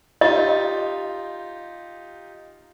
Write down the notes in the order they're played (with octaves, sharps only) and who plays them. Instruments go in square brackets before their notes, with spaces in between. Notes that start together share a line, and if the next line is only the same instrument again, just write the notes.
[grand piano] D#4 F4 G4 [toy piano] D#5